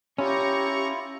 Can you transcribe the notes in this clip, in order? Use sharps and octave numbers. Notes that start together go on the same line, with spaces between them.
C#4 E4 F4 G4 A#5 C#6